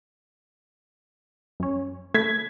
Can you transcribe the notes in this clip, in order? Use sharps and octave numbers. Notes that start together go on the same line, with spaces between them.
F#2 C#4
A3 G#6 B6